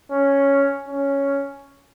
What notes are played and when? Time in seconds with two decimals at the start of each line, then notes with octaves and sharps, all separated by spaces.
0.12 C#4
0.89 C#4